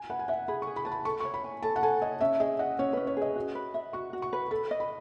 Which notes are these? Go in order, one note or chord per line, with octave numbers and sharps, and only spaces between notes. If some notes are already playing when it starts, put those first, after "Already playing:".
Already playing: G#5
B4 F#5
G#5
E5 F#5
G#4 B5
G#4 C#6
B5
B4 A5
B5
A4 C#6
C#5 C#6
B5
G#5
A4 A5
F#5
A4 G#5
C#5 D#5
C#4 E5
G#4 D#5
D#5 F#5
C#4 C#5
C#4 B4
C#5
G#4 D#5
F#4
B4
E5
F#4 C#6
F#4
C#6
B4
A4 B5
D#5
B5